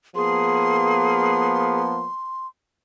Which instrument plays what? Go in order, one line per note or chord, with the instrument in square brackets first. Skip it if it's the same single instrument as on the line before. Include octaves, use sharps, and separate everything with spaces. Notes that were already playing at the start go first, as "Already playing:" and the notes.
[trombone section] F3 A#3 B3 [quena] G#4 [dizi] C6